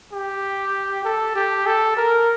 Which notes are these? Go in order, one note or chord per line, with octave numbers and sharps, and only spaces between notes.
G4
A4
G4
A4
A#4